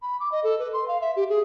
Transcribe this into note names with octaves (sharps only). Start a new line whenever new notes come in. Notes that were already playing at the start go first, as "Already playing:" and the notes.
B5
D6
D#5
A4
B4
C6
F5
E5
G4
G#4